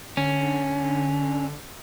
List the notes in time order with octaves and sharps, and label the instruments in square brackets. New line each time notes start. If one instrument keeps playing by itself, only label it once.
[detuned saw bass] D3 [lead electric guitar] C#4